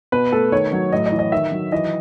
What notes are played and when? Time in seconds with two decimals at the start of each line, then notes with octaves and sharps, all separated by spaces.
0.12 B2 B4
0.32 A3 A4
0.52 D#3 C#5
0.73 F#3
0.92 A2 D#5
1.06 D#5
1.12 E3
1.19 D#5
1.32 D#3 E5
1.52 F#3
1.72 E3 D#5